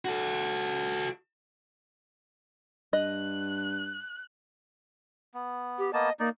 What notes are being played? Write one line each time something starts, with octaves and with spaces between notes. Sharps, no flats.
F#4 A4
G2 D#5 F#6
B3
G4
A#3 B3 D#5 A5
A#3 D#4 D5